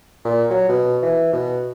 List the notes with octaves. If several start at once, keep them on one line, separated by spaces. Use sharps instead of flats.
A#2
F#3
B2
E3
B2